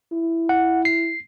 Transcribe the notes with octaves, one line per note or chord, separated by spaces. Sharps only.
E4
F#5
C7